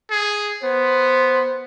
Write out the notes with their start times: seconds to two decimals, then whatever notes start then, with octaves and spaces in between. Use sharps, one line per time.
0.11 G#4
0.63 B3 C5